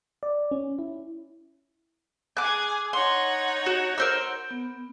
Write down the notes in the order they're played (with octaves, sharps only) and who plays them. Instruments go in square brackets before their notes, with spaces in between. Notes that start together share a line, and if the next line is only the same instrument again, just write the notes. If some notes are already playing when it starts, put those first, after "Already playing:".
[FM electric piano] D5
C#4
E4
[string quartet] G#4 G#5 [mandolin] D6 F#6
[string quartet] D#4 C#5 F#5 [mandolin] C6
[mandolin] F#4
A#4 C5 E6
[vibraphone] B3